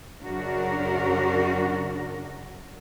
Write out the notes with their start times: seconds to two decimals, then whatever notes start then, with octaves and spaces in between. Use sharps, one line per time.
0.23 F#2 C#3 D4 F#4 A#4